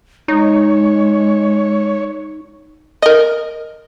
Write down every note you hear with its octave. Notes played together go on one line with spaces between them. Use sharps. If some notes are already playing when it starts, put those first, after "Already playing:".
G#3 D#4 C#5
A#4 D#5